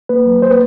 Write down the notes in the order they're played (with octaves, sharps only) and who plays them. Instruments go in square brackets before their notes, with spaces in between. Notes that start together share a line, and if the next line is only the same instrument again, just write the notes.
[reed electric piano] A#3 B4
F#3
A#3 C5
B4